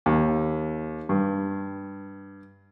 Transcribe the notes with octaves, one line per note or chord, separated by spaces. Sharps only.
D#2
G2